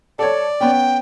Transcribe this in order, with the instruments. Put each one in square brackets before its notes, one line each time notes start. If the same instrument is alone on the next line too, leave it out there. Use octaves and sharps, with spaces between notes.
[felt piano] A4 C#5 [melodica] D5
[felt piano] B3 C#4 [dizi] G5